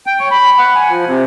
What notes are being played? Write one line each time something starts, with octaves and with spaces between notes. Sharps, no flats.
G5
C#5
B5
F#5
G#5
F3
C3